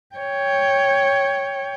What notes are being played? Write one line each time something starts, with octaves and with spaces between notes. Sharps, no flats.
C#5 G5